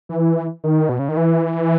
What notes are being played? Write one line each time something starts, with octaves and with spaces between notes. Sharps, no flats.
E3
D#3
B2
C#3
D#3
E3